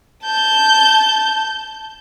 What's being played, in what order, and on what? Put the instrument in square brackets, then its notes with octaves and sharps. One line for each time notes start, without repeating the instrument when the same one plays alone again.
[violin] A5 G6